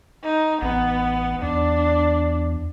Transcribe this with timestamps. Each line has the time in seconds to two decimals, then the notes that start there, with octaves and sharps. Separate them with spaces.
0.23 D#4
0.62 A1 B3
1.42 E2 D4